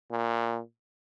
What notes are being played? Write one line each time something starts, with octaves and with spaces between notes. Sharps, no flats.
A#2